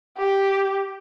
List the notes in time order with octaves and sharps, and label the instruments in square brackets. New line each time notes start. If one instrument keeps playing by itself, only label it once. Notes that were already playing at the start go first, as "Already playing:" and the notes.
[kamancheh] G4